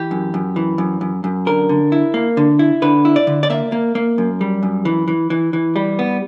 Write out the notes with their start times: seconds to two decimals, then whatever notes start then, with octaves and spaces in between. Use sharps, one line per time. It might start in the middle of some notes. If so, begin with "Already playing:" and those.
Already playing: E3 G4
0.11 F#2
0.34 F#2
0.56 E3
0.78 F#2
1.01 F#2
1.24 F#2
1.46 D3 A#4
1.69 D3
1.92 E4
2.14 A#3
2.37 D3
2.59 E4
2.82 D3 B4
3.05 E4
3.16 D5
3.27 D3
3.43 D5
3.50 A#3 E5
3.72 A#3
3.95 A#3
4.18 F#2
4.41 G3
4.63 F#2
4.85 E3
5.08 E3
5.30 E3
5.53 E3
5.76 G3
5.99 B3